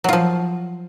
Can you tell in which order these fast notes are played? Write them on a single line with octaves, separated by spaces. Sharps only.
F#3 F4 F3